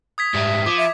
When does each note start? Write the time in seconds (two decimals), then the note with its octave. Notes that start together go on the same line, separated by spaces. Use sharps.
0.18 D#6 G#6 B6
0.34 G#2 G3 E5
0.66 F3 D6
0.77 E5